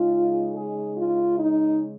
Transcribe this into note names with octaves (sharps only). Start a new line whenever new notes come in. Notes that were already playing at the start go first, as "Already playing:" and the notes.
Already playing: C#3 G#3 D#4 F4
G#4
F4
D#4